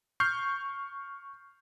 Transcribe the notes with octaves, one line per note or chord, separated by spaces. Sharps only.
C#6 F6 G6 C7